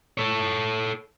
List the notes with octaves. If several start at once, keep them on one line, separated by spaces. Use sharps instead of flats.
A4 C#5